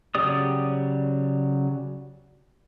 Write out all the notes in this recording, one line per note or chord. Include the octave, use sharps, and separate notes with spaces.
C#3 F#3 G4 D5 D#6